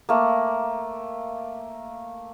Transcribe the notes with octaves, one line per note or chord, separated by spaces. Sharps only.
A3 A#3